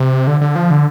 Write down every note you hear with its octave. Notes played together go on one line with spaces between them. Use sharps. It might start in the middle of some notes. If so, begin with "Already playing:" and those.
Already playing: C3
D3
D3
F3
D3